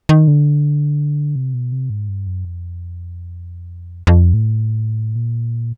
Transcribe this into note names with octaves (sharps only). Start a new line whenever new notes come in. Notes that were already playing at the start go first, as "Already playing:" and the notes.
D#3
D3
C3
B2
C3
G#2
G2
F#2
F2
F2
A2
A#2